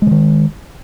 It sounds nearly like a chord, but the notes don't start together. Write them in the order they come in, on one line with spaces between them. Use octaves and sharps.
G#3 D3 D#3